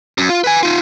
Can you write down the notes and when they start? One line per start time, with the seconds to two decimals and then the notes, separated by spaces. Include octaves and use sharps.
0.18 F#2
0.29 F4
0.44 B4 G#5
0.63 D#4 F4